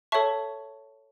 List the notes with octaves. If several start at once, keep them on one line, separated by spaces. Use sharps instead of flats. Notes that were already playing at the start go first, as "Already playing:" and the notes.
A4 C#5 E5 A5 C#6